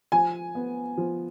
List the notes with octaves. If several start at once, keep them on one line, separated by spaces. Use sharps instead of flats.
F3 G#5
B3
F3